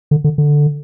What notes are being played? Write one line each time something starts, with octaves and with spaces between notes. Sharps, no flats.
D3
D3
D3